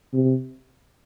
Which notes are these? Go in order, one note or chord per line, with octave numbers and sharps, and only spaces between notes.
C3